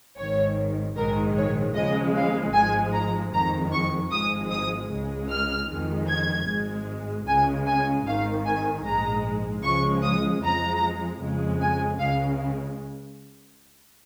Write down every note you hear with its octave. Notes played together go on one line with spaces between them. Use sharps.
G#1 G#2 D#3 C#5
A#1 G#2 D#3 G#3 A#4
C#5
D#2 C#3 F3 G#3 D#5
F5
G#1 G#2 F3 G#3 G#5
A#5
F2 D#3 G#3 A#5
C#6
G#1 G#2 F3 G#3 D#6
D#6
C#2 C#3 G#3
F6
F2 D#3 G#3
G#6
G#1 G#2 G#3
C#2 C#3 G#3 G#5
G#5
G#1 G#2 D#3 F5
G#5
A#1 G#2 G#3 A#5
C#2 C#3 F3 G#3 C#6
D#6
F2 F3 G#3 A#5
F2 C#3 G#3
G#5
C#2 C#3 G#3 F5